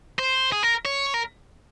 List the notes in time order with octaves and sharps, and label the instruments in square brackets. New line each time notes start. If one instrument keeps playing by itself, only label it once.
[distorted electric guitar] C5
G#4
A#4
C#5
A#4